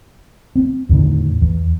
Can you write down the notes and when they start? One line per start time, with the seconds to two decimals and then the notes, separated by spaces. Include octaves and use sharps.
0.55 C4
0.89 E2 A2 D3 D#3
1.41 E2